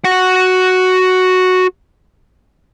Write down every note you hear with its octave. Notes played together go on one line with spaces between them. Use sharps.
F#4 F#5